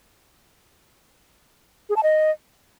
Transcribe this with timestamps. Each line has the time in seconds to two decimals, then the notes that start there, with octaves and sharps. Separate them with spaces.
1.89 G#4
1.96 A5
2.03 D#5